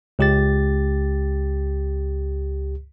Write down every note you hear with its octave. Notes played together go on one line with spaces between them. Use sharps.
C#2 G4 A6